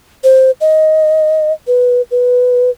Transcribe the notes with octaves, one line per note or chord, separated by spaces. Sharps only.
C5
D#5
B4
B4